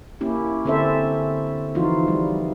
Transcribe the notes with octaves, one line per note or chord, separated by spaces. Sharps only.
A#3 C#4 E4 G4
D3 C4 C#4 A4 C5 E5
E3 F3 D#4 F4 F#4
G3